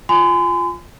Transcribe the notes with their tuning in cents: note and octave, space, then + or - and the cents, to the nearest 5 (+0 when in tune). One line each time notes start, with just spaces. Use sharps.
F4 +0 G#5 +0 C6 -45